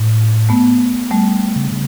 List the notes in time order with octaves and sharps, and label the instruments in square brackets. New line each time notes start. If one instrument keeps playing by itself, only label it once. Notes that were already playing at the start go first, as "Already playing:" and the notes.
Already playing: [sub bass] A2
[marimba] A3 B3
G3 A3
[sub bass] C#3
C#3